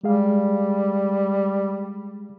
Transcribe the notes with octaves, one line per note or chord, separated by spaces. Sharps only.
G3 G#3 G#4 F5